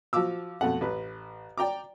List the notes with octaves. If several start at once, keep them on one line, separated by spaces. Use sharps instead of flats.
F3 F#4 F5 D6 E6
F2 B2 A3 F#5
A1 B4
D5 G5 A#5 D6